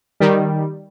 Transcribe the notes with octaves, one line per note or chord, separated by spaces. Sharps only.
D#3 G3